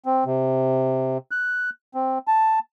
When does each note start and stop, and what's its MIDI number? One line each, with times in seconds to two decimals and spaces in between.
0.06 0.24 60
0.25 1.18 48
1.31 1.70 90
1.95 2.18 60
2.28 2.59 81